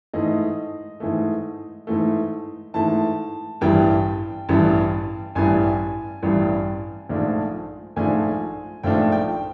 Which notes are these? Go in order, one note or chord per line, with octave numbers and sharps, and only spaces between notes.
G#2 E3 A3 D#5
G#2 E3 A3
G#2 E3 A3
G#2 E3 A3 A5
A1 G2 E3 G3 G5
A1 G2 E3 G3
A1 G2 E3 G3 G#5
A1 G2 E3 G3
A#1 G#2 F3 A3 D4
A#1 G#2 F3 A3 D4 G#5
A#1 G#2 F3 A3 D4 G5
G5